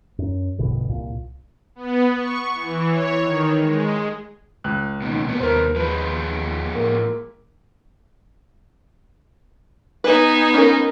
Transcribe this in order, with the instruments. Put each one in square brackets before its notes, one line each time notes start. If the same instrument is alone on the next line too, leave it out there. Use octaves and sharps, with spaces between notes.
[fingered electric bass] F#2
A#1 G2 B2 D3
C2 A#2
[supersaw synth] B3
C#6
E3
C#5
D#3
G#3
[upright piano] C#2 F#6
[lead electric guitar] D#2 B2 [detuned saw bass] D#4
[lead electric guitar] C2 B3 [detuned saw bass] A#2
[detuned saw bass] D#2 [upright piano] A#4 C5
[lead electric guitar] F3 G#3 [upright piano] B4
[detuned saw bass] A2 [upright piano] A#3
[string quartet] B3 D#4 G#5 [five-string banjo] B4
[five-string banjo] C#4 A#4